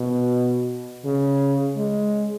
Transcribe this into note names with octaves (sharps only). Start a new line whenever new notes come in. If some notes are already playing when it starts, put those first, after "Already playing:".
Already playing: B2
C#3
G#3